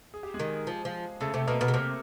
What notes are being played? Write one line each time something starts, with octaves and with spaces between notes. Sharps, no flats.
G#4
G4
G#3 G#4
D#3
F3
F3
C#3 A3 A4
C3 A3 A4
B2 A#3 A#4
B2 A#3 A#4
C#3
C3 A#3 A#4